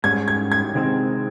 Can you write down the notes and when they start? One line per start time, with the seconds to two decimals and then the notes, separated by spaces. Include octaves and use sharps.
0.04 G#2 G3 C#4 G#6
0.28 G#6
0.52 G#6
0.75 C3 D#3 G#3 C4